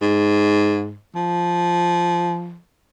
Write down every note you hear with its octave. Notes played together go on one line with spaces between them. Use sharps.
G#2
F3